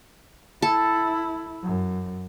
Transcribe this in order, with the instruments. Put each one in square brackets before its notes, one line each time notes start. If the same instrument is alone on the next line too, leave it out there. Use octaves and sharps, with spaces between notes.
[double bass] E4 [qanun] A4
[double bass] F#2